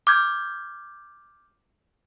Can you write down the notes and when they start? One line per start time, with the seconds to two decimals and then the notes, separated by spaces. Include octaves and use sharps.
0.07 D6 F6 G6 G#6